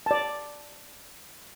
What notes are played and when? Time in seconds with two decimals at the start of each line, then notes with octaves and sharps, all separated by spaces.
0.06 D5 A5